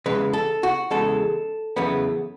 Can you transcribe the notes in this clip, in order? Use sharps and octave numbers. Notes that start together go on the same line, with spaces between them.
E2 C#3 G#3 B4
A4
F#4
E2 C#3 G#3 A4
E2 C#3 F#3 B3